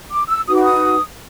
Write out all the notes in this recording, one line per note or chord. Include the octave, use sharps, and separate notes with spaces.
D6
E6
D#4 F#4 B4 D#6
D6
D#6